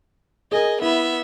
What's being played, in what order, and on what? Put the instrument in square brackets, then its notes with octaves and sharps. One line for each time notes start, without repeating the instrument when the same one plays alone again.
[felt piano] G#4 A#4 [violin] D#5 G#5
[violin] B3 E5 [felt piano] E4